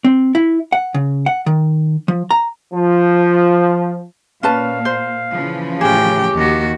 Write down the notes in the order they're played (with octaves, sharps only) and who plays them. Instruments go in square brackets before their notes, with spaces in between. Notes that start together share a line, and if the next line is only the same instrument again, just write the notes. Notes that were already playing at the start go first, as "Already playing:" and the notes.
[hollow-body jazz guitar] C4
E4
F#5
C#3
F#5
D#3
F3
A#5
[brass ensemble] F3
[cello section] A#2 [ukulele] C#4 B4 A5 [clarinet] F5
[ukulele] C5
[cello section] C#3 E3 F3
[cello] A2 G5 [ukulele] C#4 G#4 [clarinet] G4
[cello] D#2 F#4